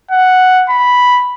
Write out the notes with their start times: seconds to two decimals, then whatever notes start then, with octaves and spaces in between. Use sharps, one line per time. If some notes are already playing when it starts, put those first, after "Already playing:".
0.11 F#5
0.70 B5